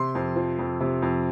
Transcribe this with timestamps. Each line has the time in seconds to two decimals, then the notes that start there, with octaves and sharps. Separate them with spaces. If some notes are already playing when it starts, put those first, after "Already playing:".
Already playing: C3 C6
0.15 F2
0.36 F3
0.59 F2
0.80 C3
1.02 F2